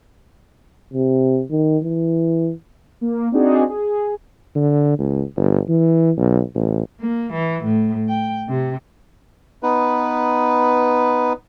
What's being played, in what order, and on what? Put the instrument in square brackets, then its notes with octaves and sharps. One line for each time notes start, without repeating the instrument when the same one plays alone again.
[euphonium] C3
D#3
E3
[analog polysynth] A#3
C4 D4 D#4 F#4 G#4
G#4
[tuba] D3
C#2
G1
E3
B1
A1
[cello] A#3
E3
A2
G5
C3
[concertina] B3 D#4 B4